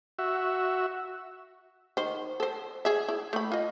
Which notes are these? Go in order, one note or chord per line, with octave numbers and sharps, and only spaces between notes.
F#4 E5
D#3 C5
A4 C5
G#4 E5
E4
A3 B5
F4 D#5